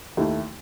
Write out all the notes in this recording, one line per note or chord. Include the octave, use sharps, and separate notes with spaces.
D#2 D#3 A3 E4